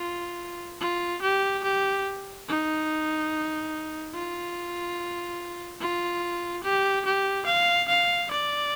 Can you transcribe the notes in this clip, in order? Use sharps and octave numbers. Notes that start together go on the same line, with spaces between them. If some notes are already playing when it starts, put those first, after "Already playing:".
Already playing: F4
F4
G4
G4
D#4
F4
F4
G4
G4
F5
F5
D5